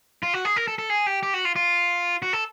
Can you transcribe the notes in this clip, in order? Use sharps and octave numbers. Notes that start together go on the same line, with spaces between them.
F4
F#4
G#4
A#4
A4
A4
G#4
G4
G4
F#4
F4
F4
F#4
A4